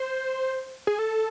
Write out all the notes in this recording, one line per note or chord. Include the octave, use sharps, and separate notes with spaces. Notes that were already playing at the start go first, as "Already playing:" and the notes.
Already playing: C5
G#4
A4